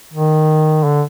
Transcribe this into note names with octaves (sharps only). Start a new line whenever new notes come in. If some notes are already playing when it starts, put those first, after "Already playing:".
D#3
D3